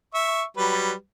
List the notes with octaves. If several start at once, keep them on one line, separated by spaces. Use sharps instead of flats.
E5 C#6
F#3 G3 B4